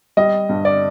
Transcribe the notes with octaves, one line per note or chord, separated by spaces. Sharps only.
G3 D#5
G2
D5